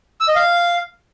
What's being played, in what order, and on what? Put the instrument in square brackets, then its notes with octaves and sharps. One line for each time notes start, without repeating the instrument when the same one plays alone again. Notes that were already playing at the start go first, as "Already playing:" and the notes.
[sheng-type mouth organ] E6
D#5
F5